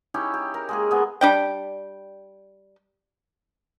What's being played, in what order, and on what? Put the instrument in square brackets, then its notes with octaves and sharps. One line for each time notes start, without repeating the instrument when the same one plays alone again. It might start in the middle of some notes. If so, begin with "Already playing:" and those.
[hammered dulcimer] C#4 D#4 E4 G4
G4
A#4
G#3 A#3 G#4
G#3 B3
[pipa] G3 D4 G5